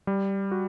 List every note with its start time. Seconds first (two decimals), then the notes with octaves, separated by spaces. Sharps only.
0.07 G3
0.52 F#4